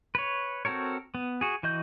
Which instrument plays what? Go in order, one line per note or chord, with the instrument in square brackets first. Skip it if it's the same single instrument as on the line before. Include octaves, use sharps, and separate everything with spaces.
[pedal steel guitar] B4 C#5
C4 F#4 A4 A#4 C#5
B3
F#4 G#4
E3 F#4 D#5 G6